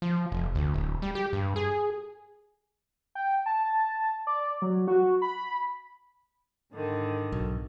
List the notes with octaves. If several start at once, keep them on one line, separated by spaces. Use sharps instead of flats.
F3
F1
D2
D1
G3
G4
G2
G#4
G5
A5
D5
F#3
F#4
B5
G#2 D3 D#3
B1